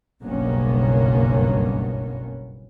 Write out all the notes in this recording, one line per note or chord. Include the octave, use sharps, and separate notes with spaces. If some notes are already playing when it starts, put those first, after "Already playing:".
F#1 B1 G2 A#3 B3 C#4